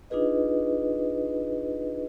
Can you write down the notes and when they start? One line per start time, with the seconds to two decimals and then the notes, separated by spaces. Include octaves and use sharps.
0.10 D4 D#4 F4 G#4 B4 D#5